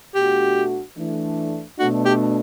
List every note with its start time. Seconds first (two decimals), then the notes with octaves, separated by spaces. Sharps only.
0.15 B2 A3 D4 F#4 G4
0.97 E3 A3 D4
1.79 B2 A3 D4 F#4
2.05 G4